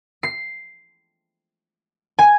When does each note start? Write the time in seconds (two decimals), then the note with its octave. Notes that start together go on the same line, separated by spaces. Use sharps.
0.23 C7
2.19 G#5